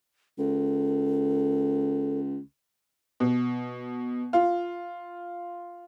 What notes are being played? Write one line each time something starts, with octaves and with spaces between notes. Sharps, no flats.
C#2 A4
B2
F4